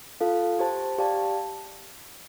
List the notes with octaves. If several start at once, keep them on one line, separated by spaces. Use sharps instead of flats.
F4 A4 F5 A5
G4 C5 A5
G4 D5 F5 A5